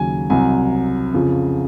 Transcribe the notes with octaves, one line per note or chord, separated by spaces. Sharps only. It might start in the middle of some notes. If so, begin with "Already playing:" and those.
Already playing: D#2 C#3 F#3 G#5
C2 C3 F#3 G#5
F2 C#3 F3